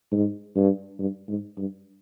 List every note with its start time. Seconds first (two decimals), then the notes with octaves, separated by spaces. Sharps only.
0.12 G#2
0.56 G2
0.99 G2
1.28 G#2
1.57 G2